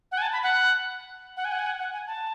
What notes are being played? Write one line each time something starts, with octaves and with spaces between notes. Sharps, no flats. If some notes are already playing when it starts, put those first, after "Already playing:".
F#5
G#5
A5
B5
F#5
F#5
G#5
F#5
G#5
F#5
F#5
G#5
A5